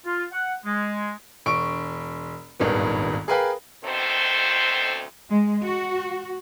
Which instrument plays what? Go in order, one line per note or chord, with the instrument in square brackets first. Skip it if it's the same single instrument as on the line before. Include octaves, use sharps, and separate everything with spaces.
[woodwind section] F4
F#5
G#3
[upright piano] E1 C#6 D7
D#1 G#1 G2 D#3 B3
G#4 A#4 B4 F5 G5 B5
[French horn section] D2 B2 D#3 C4 A4 C5
[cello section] G#3
F#4